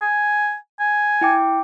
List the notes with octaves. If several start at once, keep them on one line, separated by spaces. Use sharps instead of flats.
G#5
G#5
E4 G5 D6